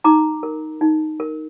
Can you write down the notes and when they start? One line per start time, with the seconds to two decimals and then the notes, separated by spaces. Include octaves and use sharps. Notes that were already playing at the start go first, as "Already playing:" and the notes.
0.04 D#4 A#5 D6
0.43 A#4
0.81 D#4
1.20 A#4